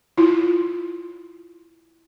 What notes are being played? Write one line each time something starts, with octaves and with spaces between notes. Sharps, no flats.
E4 F4